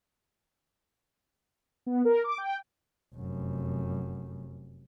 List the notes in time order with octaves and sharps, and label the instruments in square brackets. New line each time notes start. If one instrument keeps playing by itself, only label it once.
[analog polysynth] B3
A#4
D6
G5
[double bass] F1 F#2